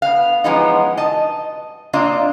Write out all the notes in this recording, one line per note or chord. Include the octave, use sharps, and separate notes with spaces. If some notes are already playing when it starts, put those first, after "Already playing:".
B3 F5
E3 F3 G#3 B3 C#4 D#4
D#5 A5
A#3 C4 D4 F4 D5 D#5